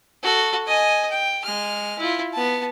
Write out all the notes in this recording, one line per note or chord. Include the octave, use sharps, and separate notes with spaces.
F#4 A4
D#5 G#5
G5
G#3 F6
E4 F4
B3 A5